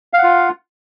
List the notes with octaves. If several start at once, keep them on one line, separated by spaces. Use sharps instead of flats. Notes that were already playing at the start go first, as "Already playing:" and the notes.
F4 F5 F#5